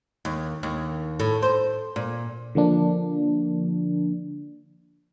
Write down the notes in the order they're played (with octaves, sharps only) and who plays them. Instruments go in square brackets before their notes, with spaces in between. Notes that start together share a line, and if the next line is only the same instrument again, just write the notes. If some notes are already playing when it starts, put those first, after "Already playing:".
[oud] D#2
D#2
A2
C5
A#2
[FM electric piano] D3 F3 A#3 D4